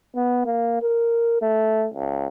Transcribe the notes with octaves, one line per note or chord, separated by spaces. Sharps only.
B3
A#3
A#4
A3
C#2